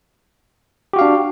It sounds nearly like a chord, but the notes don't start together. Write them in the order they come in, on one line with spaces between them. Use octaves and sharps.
G4 F#4 F5 D4